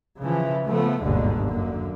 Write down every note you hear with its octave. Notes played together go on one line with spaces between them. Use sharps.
C#3 E3 F3
C#3 F3 A3 B3
G1 D#2 G#2 B2 D3
F#2 D3 A#3